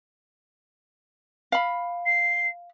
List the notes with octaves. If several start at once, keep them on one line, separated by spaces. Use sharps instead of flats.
F5 B5
C7